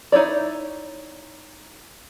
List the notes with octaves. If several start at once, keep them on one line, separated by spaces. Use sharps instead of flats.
D#4 E4 C#5 D5